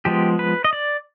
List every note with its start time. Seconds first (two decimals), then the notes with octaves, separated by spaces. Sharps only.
0.05 F3 G#3 B3 G4
0.39 B4
0.64 D#5
0.73 D5